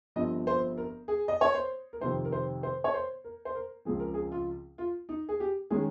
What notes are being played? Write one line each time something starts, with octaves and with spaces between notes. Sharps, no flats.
G1 G2 F3 C4 D#5
C5
A#4
G#4
D#5
C#5
C5
A#4
F2 C3 D#3 A#3 C5
A#4
C5
C5
C#5
C5
A#4
C5
A#4
C#2 C#3 F3 C4 G#4
A#4
G#4
F4
F4
D#4
G#4
G4
D#3 G#3 C#4 G#4